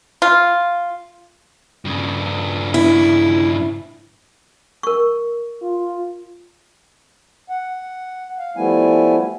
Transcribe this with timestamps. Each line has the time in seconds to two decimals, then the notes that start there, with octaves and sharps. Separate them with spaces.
0.22 F4
1.85 G2 C#3
2.74 E4
4.83 A#4 C#6
5.63 F4
7.49 F#5
8.39 F5
8.57 F3 G3 A3 B3 E4 G#5